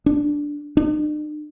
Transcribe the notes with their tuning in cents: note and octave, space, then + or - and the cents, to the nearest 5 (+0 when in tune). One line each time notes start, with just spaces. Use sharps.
D4 -5
D4 +45